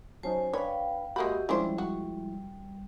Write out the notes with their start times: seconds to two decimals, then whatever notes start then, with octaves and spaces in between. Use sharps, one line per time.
0.23 F#3 C#4 D#4 C5 G#5 A5
0.54 D4 B4 C#5 F5 G5 B5
1.16 G#3 A#3 F#4 G4 D#5 E5 B5
1.49 F3 G3 G#3 C#4 D4 E4 C5
1.78 F#4